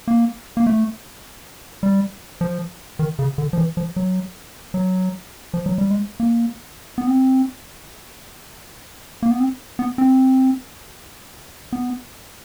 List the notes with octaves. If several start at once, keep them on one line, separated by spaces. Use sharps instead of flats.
A#3
A#3
A3
G3
F3
D#3
C#3
D3
F3
E3
F3
F#3
F#3
F3
F#3
G3
G#3
A#3
B3
C4
A#3
B3
C4
B3
C4
B3